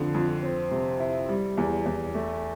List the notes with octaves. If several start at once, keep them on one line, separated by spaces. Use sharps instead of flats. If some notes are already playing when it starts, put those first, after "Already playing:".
Already playing: F2 D3
F2
C4
C3
E4
G3
E2
E2
A3